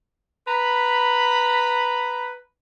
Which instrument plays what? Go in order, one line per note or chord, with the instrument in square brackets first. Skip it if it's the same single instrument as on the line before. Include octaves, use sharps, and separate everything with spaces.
[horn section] B4 A#5 B5